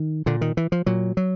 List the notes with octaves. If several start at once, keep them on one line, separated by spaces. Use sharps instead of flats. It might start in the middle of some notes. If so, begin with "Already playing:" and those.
Already playing: D#3
A#2 D3
D#3
E3
F3
A#2 F#3
F#3